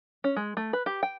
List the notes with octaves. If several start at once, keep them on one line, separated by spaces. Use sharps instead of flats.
C#4
G#3
A3
B4
G4
G5